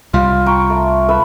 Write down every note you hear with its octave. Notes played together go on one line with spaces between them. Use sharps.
C2 G3 F4
G5 A#5 C#6
A3
A4 B4 E5